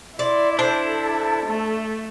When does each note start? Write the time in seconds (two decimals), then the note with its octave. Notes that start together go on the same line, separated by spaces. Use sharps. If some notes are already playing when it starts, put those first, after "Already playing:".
0.19 E4 D5 C6
0.59 D4 A4 C5
1.46 A3